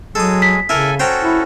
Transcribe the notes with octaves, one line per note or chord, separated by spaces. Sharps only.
F#3 G#3 G#4 A4 D#6
B6
C#3 E4 A4 A#4 G#5
C#4 F#4 A4 C5 G5 A#5
E4